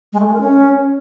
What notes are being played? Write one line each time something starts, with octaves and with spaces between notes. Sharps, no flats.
G#3
A3
G#3
A#4
C#4